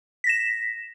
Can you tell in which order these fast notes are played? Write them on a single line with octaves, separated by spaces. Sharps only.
B6 A#6 E7